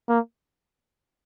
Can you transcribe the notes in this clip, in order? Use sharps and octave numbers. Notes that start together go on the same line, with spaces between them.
A#3